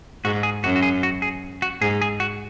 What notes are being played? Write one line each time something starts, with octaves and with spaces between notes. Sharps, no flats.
G#2 F#4
G#4
F#2 F#4
F#4
G#4
F#4
G#4
F#4
G#2 G#4
G#4
F#4